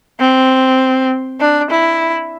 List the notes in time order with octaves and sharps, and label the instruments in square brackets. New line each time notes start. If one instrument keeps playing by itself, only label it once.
[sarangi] C4
D4
E4